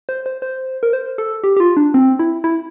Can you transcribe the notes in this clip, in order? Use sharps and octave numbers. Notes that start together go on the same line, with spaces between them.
C5
C5
C5
A#4
C5
A4
G4
G4
F4
D4
C4
E4
E4